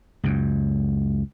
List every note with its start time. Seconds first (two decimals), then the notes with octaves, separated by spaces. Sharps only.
0.24 C#2 F#2